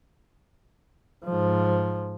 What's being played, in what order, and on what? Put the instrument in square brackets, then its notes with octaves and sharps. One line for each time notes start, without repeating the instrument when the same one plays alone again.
[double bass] G#2 F3